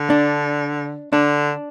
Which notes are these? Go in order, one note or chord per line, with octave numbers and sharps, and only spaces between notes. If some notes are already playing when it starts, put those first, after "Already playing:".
Already playing: D3
D4
D3 D4